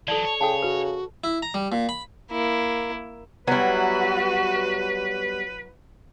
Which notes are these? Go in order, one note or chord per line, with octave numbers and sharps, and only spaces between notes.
E3 F#3 A4 D5 A5
C#5
C#3 A4 F#5 G5 A5
F#4 B4
E4
A#5
G3
A#2
B5
A#3 E4
F#3 G3 B3 E4 F#4 B4